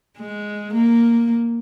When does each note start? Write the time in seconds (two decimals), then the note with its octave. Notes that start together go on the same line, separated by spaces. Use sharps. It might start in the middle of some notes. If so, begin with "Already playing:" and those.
0.18 G#3
0.74 A#3